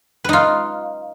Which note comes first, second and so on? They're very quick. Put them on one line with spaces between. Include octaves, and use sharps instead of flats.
B4 D#4 F4